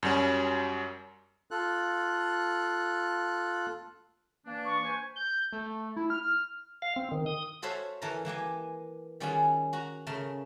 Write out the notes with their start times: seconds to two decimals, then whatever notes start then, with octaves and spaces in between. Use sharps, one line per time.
0.03 F#2 F#3 G3 C#4
1.51 F4 A4 F#6
4.46 E3 A#3 D4
4.65 C#6
4.83 B4 C5 G#5
5.16 G6
5.53 A3
5.96 E4
6.10 F6
6.82 F5
6.96 C4
7.11 D#3
7.26 D#6
7.62 F#4 A4 C5 C#5 E5 F5
8.02 E3 A4 A#4 A#5
8.25 E3 A#3 G4 G#5
9.20 D#3 G3 C#4 F4 F#4 G#4
9.73 F#4 A#5
10.07 C#3 A3 A#4